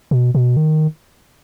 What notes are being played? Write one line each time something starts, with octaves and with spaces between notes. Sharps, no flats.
B2
B2
D#3